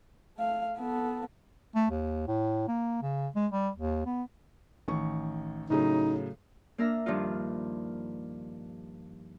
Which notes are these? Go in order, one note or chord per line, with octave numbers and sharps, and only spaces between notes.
A3 F5
B3 A4
A3
D#2
A2
A#3
C#3
G#3
G3
D#2
B3
A1 D#3 C#6
A2 C#3 F#3 D#4
A#3 D4 A#4 E5 A#5
G2 D#3 F3 D4 D#4 F4